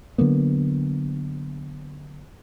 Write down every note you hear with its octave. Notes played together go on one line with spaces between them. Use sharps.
D3 F#3 A#3 B3